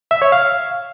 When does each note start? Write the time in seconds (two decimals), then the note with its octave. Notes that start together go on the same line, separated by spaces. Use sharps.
0.11 E5
0.22 C#5
0.32 F5